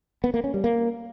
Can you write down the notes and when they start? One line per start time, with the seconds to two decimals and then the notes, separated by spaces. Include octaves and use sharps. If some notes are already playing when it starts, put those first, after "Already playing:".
0.24 B3
0.34 A#3
0.44 C#4
0.54 G3
0.64 A#3